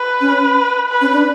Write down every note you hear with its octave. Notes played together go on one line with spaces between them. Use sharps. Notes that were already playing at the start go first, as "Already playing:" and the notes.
Already playing: B4
C#4
B4
C#4
D4